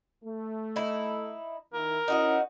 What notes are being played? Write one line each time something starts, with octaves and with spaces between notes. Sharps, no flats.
A3
D#4 E4
D#3 E4 A#4
C#4 D#4 E4 F#4 D#5